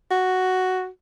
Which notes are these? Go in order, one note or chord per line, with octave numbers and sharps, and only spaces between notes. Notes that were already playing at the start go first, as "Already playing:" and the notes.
F#4